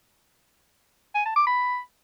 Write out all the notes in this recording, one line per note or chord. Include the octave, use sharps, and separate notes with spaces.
G#5
A5
D6
B5